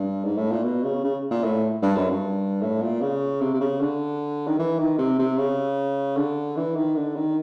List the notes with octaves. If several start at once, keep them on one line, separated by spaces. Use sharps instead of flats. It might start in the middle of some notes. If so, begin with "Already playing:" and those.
Already playing: G2
G#2
A2
A#2
B2
C#3
C#3
A#2
A2
G2
F#2
G2
A2
A#2
C#3
C3
C3
C#3
D3
D#3
E3
D#3
C3
C3
C#3
D3
E3
D#3
D3
D#3